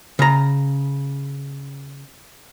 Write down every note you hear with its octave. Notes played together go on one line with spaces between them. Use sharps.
C#3 A#5